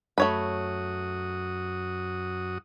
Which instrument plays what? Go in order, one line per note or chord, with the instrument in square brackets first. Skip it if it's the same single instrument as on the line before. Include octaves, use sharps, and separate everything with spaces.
[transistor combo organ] F#2 F#4 D#6 [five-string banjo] A3 C#5 B5